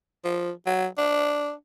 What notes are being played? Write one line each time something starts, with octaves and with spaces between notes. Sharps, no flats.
F3
F#3
D4